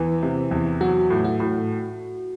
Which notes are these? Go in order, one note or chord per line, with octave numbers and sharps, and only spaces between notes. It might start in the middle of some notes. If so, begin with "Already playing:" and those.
Already playing: E2 E3
C3
E2
F#3 F#4
A2
F#4
A2